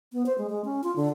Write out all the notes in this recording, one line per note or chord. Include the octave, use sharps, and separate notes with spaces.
B3
C5
G#3
G#3
C#4
F4
D3